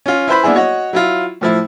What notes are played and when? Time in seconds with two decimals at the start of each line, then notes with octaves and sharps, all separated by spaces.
0.06 C#4 F4
0.28 E4 B4 C5 B5
0.43 A#3 B3 D4 E4 G#4
0.55 F#4 C#5 D#5 F#5
0.93 F#3 E4 F4
1.41 A2 F3 E4